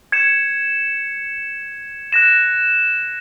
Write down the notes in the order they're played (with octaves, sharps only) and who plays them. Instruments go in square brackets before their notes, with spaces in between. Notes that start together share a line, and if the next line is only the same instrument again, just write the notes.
[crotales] G#6 C#7 E7
F#6 A#6 E7